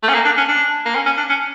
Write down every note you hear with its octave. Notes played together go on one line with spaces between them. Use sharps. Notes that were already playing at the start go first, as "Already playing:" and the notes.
A3
C#4
A#3
D4
C#4
D4
A#3
C#4
C#4
D4
C#4